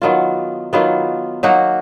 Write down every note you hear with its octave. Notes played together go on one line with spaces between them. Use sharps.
D#3 F#3 B3 F4
D#3 F#3 B3 F4
F#3 A#3 D#4 F#4